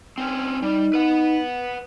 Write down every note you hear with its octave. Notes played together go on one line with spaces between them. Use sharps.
C4 C#4
G3 D#4
B4 F#5